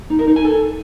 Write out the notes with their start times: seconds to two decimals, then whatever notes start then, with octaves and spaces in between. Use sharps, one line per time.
0.10 D#4
0.19 A#4
0.28 D#4
0.36 G#5
0.45 A4